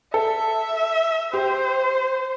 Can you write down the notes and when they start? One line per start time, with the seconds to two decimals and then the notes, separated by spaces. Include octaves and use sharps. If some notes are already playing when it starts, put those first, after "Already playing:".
0.14 A4 E5
1.33 G4 C5